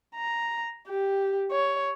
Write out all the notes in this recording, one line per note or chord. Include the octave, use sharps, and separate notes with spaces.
A#5
G4
C#5